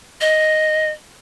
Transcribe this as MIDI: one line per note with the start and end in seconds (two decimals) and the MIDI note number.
0.21 0.90 75